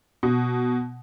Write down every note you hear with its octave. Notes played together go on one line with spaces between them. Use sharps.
B2